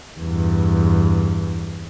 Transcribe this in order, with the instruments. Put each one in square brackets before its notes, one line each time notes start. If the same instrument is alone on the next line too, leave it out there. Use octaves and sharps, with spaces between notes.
[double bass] E2 G2